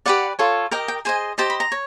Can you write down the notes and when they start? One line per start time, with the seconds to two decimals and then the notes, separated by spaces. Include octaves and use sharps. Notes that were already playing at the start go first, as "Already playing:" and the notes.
0.06 G4 B4 D5 F#5
0.39 F4 A4 C#5
0.71 G4 A#4 D#5 G5
0.88 G5
1.05 G#4 C5 D#5 G#5
1.38 G4 C5 D#5 A5
1.50 B5
1.60 A#5
1.72 C#5